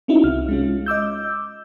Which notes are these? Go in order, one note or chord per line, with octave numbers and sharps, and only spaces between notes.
C4 C#4 D#4 E4 F#4
C2 F6
G#3 C#4 F4
D#5 D6 E6 G6